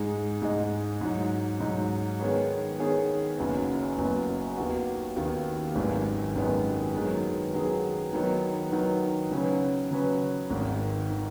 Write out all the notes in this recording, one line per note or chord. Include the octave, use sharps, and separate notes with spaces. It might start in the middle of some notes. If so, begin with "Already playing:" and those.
Already playing: G#2 G#3 D#4 G#4 D#5
G#2 G#3 D#4 G#4 D#5
G#2 F#3 D#4
G#2 F#3 D#4
D#3 B3 G#4 C#5
D#3 B3 G#4 C#5
F#1 F#2 F#3 B3
F#1 F#2 F#3 B3
D#2 D#3 B3 F#4
D#2 D#3 B3 F#4
G#1 F#2 D#3 G#3 B3
G#1 F#2 D#3 G#3 B3
D#3 F#3 B3 G#4
D#3 F#3 B3 G#4
D#3 F#3 B3 D#4
D#3 F#3 B3 D#4
C#3 F#3 C#4 B4
C#3 F#3 C#4 B4
G#1 G#2 D#3
D#3